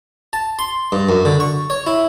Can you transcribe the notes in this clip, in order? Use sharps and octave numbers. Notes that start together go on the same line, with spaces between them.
A5
C6
G2
F#2
D3
C#6
C#5
E4